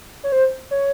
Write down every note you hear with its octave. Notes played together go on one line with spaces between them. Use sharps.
C#5
C5
C#5